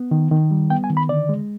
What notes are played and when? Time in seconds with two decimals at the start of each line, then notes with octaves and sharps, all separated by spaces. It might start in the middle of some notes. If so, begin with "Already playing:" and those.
Already playing: B3
0.11 D#3
0.31 D#3
0.51 G3
0.70 B3 G5
0.84 G#5
0.90 D#3
0.97 B5
1.09 D3 D5
1.29 G#3